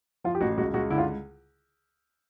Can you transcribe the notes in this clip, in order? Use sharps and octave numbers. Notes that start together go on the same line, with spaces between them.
F3 F4
G4
A1 F#4
C#2 F#4
C#2 F#4
D3 E4
F4